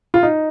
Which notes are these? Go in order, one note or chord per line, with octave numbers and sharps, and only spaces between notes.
F4
D#4